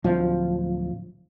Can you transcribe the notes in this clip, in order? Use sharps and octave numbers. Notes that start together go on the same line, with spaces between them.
D1 F3